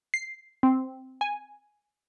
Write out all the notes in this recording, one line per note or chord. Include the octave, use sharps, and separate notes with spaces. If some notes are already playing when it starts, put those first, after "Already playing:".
C7
C4
G#5